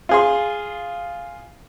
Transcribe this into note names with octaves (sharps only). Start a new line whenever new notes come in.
F4 G#4 C6